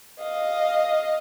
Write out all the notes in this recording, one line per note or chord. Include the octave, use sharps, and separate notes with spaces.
D#5 F5